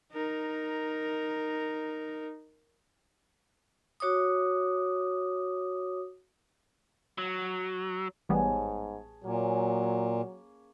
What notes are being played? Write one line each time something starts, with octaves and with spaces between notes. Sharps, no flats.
D#4 A#4
F#4 C#5 D6 D#6
F#3
A1 G#2 G3 B3 G#4 C#5 A5
A#2 F#3 A#3 C#4 G#5